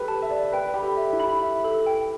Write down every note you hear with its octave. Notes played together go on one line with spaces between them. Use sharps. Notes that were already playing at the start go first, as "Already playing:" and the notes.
Already playing: G4 A4 B4
A5
E5
D5
B4 G5
G4 B5
A4
E5
E4
B5
E5
A4
G5